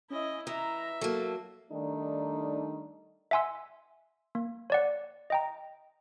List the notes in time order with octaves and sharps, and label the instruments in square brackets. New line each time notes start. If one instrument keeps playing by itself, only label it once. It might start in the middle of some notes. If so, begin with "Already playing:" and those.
[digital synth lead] C#4 [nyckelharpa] E4 D#5
[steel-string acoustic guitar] E3 [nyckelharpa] E5 [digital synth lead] A#5
[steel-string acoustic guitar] F#3 A#3 [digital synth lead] A4
[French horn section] D#3 G3 A3 D4 D#4
[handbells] E5 F#5 G#5 C6 E6
A#3
C#5 D5 F#5
D#5 G5 A#5